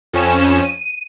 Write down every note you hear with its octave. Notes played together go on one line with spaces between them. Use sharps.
F2 C#4 E7
D#7